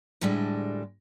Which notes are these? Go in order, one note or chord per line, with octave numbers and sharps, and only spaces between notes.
D2 A2 G3 G#3 D4